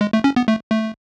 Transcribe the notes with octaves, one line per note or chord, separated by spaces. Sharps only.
G#3
A3
C#4
B3
A3
A3